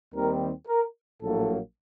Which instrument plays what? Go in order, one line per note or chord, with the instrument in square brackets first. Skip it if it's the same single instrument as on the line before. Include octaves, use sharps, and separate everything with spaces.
[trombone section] D#2 D#3 G3 C4 A#4
A#4
A#1 A2 F#3 A#3 A4